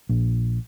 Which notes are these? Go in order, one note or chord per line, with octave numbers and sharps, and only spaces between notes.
A#1